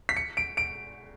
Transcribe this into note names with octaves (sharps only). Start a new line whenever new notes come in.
B6
C#7
D7
D7